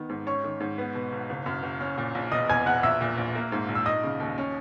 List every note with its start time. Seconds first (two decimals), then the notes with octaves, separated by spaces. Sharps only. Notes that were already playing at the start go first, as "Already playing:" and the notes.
Already playing: D#3 B3
0.09 G#2
0.27 C#4 C#5 C#6
0.44 D#3
0.60 G#2
0.78 B3
0.95 B2
1.12 B1
1.29 F#1
1.46 F#2
1.63 F#1
1.81 C#4
1.98 A#2
2.15 A#1
2.31 E1 D#5 D#6
2.49 E2 G#5 G#6
2.66 E1 F#5 F#6
2.83 A#1 E5 E6
3.01 A#2
3.18 A#1
3.35 A#3
3.52 G#2
3.69 A#1
3.75 E6
3.86 D#4 D#5 D#6
4.03 C#3
4.20 D#2
4.38 C#4